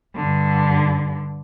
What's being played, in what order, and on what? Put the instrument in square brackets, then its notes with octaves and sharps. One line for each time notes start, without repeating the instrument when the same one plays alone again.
[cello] G2 D3